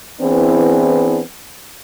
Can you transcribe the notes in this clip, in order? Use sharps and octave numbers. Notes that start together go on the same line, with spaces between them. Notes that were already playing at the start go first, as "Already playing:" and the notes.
E3 B3 C4 D4 E4 G#4